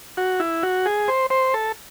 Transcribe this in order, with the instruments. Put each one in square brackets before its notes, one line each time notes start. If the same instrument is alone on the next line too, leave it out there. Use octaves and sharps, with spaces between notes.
[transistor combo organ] F#4
E4
F#4
G#4
C5
C5
A4